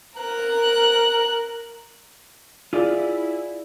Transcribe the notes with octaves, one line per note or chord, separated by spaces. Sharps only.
A#4 F#6
E4 F4 G#4 D5